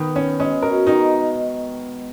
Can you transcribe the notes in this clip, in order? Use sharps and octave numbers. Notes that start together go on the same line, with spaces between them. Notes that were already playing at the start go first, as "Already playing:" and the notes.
Already playing: D#3 B3
C#4
G#3 C#4
B2 A#4
D#3 D#4